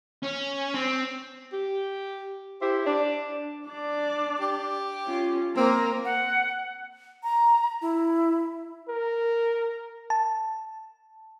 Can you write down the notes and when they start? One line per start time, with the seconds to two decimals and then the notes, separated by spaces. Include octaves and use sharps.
0.23 C#4
0.74 C4
1.52 G4
2.61 E4 G4 C5
2.86 D4 D5
3.66 D4 D5
4.40 G4
5.05 C#4 F4
5.57 A#3 C4 A#4
6.05 F#5
7.23 A#5
7.81 E4
8.88 A#4
10.10 A5